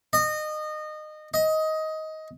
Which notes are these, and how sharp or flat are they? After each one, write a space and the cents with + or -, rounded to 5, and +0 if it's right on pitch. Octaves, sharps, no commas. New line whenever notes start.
D#5 -25
D#5 +15